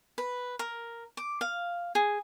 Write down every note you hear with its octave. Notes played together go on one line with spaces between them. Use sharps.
B4
A#4
D6
F5
G#4